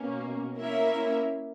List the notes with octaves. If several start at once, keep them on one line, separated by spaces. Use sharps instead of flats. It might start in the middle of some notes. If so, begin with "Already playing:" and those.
Already playing: B2 A#3 C#4
A#3 C#4 E4 A#4 E5